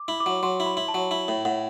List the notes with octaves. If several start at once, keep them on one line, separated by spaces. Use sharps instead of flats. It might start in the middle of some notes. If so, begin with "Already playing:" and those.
Already playing: D6
E4
D6
F#3
F#3 C6
E4
B5
E4
A5
F#3
E4
A2
A2 F#5